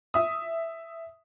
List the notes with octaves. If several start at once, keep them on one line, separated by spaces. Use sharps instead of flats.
E5 D#6